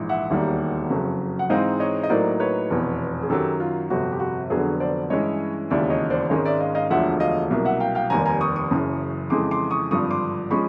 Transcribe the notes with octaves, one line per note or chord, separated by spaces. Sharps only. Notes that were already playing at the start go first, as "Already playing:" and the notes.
Already playing: A#1 G#2 E3
E5 F#5
E1 D#2 D#3 G3 A#3
F#1 F2 C#3 F#3
F#5
G#2 E3 G#3 C4 D#4 D#5 F5
C#5 D#5
D#5
A2 F#3 A#3 D#4 C5 D5
B4 C#5
F1 E2 B2
G#4
F#2 D#3 F#3 G4 A4
F4
G1 F2 C3 F#4
G4
F#4
F1 F2 D3 F#3 B3 F#4 G#4
C5 D5
G2 E3 G#3 C#4 E4 C#5 D#5
E1 D#2 C#3 E3 D5 E5
C#5 D#5
C5 D5
G#1 G#2 D#3 G#3 C#4 C#5 D#5
D5 E5
D#5 F5
D#5 F5
E1 D2 D3 F3 E5 F#5
D#5 F5
C2 B2 F#3 A#3
E5 F#5
F5 G5
F5 G5
F1 D#2 D#3 G3 G#5 A#5
G#5 A#5
C#6 D#6
C#6 D#6
F#1 F#2 C#3 E3
F2 C#3 E3 G#3 C6 D6
C6 D6
C#6 D#6
G#1 G2 D3 F3 C#6 D#6
C6 D6
F3 G#3 C#4 B5 C#6